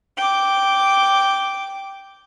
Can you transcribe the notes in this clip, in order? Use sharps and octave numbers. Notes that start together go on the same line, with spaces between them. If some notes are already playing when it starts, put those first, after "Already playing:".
G5 D6